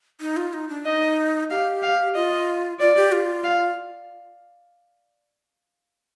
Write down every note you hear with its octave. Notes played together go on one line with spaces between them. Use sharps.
D#4
F4
D#4
D4
D#4 D#5
G4 F5
F5
F4 D#5
F4 D5
G4
F4
F5